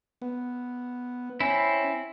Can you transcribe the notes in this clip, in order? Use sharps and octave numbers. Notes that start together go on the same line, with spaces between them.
B3
C4 C#4 E4 G5 G#5 A#6